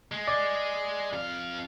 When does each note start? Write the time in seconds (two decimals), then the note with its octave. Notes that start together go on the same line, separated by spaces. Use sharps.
0.12 G#3
0.28 D5
1.13 F2 F5